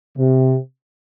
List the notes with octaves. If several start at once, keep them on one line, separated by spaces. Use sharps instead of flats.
C3